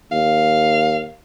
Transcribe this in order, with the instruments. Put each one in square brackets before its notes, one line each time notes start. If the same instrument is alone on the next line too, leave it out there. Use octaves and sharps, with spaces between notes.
[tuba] D#2 [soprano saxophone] F5